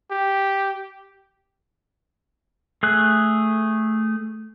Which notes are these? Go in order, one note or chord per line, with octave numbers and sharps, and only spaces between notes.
G4
A3 G#4 F#6